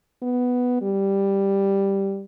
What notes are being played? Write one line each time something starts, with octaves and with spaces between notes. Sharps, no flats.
B3
G3